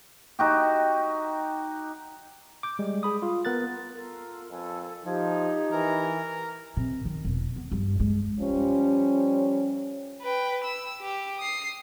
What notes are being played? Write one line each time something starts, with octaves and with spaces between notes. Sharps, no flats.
D#4 F#4 G4
D6 G6
G3 G#3
G#4 B5 D#6
F4
B3 A#4 F#6 A6
F4 A4 A#4
F2 A4 B4 G#5
F3 D#4 G4 G#6
E3 A#4 A#5
C3
D#3
E1
B3
G2
G#3
F3 G3 C#4
B4 G5
E6
G4
D#6 C7